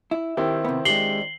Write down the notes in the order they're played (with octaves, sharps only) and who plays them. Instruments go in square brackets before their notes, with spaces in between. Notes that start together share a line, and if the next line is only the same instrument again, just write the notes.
[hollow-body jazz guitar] E4
[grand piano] D#3 C4 E4 [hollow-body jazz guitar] G4
[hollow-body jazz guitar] C3 B3
[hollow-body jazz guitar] G#3 D4 G4 [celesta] C7 F#7 G7